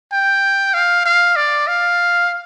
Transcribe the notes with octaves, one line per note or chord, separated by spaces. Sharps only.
G5
F5
F5
D5
F5